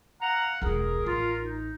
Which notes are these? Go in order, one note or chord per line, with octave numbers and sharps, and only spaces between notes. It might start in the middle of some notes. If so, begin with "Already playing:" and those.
F5 F#5 A#5
E1 C#2 G#4 A#4
A1 F4
D#4